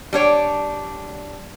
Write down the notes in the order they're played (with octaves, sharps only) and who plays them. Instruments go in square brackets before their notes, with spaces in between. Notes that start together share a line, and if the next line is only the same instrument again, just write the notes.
[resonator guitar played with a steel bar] G3 D4 C#5